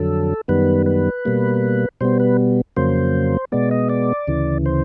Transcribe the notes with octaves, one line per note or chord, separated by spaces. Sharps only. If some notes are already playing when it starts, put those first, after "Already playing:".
Already playing: F2 D3 F#3 A4
F#2 D#3 G3 B3 B4
B4
B2 G3 A#3
B2 G3 B3 C5
B4
F2 C#3 F#3 A#3 C5
B2 G#3 B3 D5
D#5
D5
D2 C#3 E3
C5